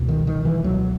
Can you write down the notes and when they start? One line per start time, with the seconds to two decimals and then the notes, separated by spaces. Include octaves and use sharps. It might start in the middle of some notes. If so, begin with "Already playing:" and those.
Already playing: C#2 B2
0.09 D#3
0.27 D#3
0.45 E3
0.64 C#2 B2 F#3